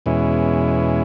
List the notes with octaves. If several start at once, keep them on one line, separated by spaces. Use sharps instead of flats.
E2 B2 G#3 C#4 E4